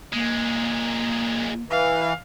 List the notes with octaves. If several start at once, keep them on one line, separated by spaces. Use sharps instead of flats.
A#2 G#3 A#3
E3 F5